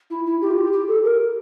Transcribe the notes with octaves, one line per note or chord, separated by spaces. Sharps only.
E4
E4
G4
F4
G4
G4
A4
A#4